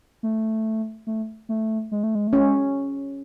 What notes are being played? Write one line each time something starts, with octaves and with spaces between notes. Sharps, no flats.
A3
A3
A3
G#3
A3
G#3
A3
C#4
G#3